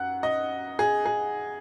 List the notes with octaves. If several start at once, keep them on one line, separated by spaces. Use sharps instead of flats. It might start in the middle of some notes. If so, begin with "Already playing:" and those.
Already playing: F#2 F#5
D#5
G#4
G#4